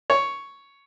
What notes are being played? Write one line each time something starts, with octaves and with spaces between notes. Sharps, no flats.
C#5